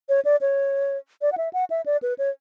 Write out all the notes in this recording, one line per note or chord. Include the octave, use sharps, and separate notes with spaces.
C#5
D5
C#5
D5
F#5
E5
F#5
E5
D5
B4
C#5